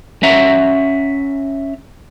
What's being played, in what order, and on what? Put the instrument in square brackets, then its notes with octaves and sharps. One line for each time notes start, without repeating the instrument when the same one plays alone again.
[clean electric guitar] C#4 E5 F#5 A#5